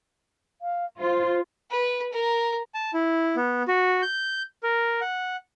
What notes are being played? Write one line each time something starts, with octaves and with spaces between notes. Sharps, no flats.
F5
F4 C5
B4
A#4
A5
E4
B3
F#4
G6
A#4
F#5